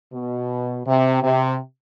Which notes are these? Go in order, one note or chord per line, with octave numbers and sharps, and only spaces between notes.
B2
C3
C3